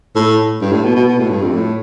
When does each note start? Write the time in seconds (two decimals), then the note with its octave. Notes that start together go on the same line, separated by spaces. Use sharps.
0.16 A2
0.61 G2
0.72 A2
0.84 B2
0.96 B2
1.07 B2
1.18 A2
1.30 G2
1.42 F2
1.53 A2